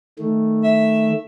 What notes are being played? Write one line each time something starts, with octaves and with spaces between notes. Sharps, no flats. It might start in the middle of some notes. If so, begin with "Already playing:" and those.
D#3 A3
E5